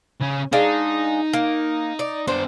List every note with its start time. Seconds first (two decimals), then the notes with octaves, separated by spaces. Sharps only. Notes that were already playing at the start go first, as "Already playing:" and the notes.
0.21 C#3 C#4
0.53 G#3 D4 D#4 F5
1.33 A#3
1.99 D5
2.27 B3 D4 C5